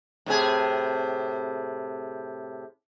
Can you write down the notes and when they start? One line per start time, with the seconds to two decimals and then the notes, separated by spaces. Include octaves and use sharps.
0.26 A2 C3 G#4